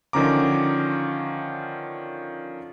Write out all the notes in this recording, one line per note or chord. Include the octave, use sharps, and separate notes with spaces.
D3 D#3 F3 C#4 A#5 D6